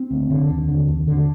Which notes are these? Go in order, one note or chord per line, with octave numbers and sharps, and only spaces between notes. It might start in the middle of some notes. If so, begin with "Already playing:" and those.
Already playing: C4
D2
D3
D#2
D3
D#2
D3